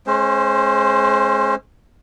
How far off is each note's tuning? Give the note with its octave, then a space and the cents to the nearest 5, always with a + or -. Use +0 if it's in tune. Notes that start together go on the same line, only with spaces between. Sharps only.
G#3 +30 C#4 -30 C5 +0